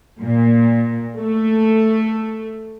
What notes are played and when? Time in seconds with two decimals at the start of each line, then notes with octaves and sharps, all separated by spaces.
0.21 A#2
1.18 A3